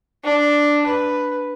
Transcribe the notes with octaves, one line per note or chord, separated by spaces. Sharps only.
D4
B4